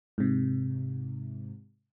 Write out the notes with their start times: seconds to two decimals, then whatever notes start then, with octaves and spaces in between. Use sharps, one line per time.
0.18 G#2 C3